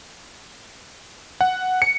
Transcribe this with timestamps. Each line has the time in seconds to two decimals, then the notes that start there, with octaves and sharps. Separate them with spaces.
1.41 F#5
1.82 C#7